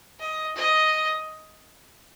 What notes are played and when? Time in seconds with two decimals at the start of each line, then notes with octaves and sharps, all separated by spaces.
0.19 D#5
0.56 D#5